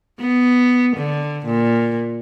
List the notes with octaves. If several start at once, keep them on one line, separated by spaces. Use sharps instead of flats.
B3
D3
A#2